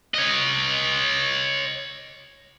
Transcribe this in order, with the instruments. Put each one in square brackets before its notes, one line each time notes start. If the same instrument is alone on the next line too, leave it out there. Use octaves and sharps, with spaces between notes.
[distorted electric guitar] C#5 D#5